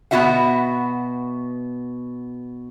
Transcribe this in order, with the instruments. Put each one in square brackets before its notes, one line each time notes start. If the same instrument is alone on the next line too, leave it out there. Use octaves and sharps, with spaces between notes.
[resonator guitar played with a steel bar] B2 B3 C#4 F#4 E5 F#5